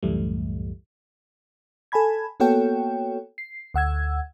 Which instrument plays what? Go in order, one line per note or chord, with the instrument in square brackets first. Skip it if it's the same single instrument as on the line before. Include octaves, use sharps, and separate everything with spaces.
[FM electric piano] C2 F#2 A2 E3 G3 A3
A4 G#5 A5 B5 G#6
A#3 B3 F#4 A4 C#5 G5
C7
D2 F#5 E6 G#6